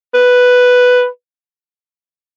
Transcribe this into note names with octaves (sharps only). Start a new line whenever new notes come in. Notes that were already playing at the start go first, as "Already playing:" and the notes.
B4